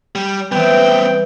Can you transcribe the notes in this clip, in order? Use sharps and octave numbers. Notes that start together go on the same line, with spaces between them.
G3
E3 G3 B3 C4 G5